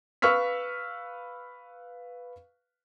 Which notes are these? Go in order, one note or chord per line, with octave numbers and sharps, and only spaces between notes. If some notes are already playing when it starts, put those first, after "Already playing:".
B4 F5 C#6 E6 F6 B6